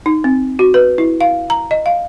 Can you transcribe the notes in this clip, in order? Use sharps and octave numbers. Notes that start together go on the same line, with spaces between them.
D#4
C4
F#4
B4
E4
F5
A#5
D#5
F5